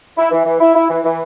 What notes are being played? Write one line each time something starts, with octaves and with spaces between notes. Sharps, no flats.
E4
E3
E3
E4
E4
E3
E3